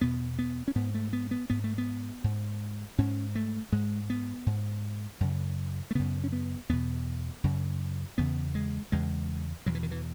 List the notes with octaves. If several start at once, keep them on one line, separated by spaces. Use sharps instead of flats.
E2 B2 B3
B3
C#4
G#2 B3
A3
B3
B3
G#2 B3
A3
B3
G#2
G#2 C#4
A3
G#2 G#3
B3
G#2
F#2 C#3
A3
F#2 C#3 B3
C#4
B3
E2 B2 B3
F#2 C#3
E2 C#3 B3
G#3
E2 C#3 G#3
E2 B2 F#3
E3
D#3
E3